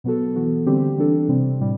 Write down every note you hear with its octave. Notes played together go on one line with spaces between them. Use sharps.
B2 F#3 B3 F#4 A4
E3 B3 F#4 A4
D3 G3 C4 G4
E3 G3 D4 A4
C3 G3 C4
A2 G3